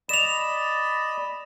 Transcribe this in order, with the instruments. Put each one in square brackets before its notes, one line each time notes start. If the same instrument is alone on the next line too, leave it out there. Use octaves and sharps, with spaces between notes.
[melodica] D5 D#5 B5 [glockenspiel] E7 F7